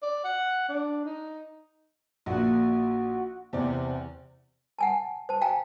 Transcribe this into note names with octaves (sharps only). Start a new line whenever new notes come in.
D5
F#5
D4
D#4
A#1 A#2 A#3 F#4
E2 C3 C4 D5
F#5 G#5 A5
C5 A5
F5 G5 G#5 A#5